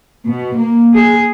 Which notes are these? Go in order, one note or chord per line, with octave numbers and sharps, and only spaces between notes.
B2
A#3
G#4